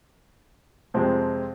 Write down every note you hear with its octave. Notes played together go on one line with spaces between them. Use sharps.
F2 C3 F3 G#3 C4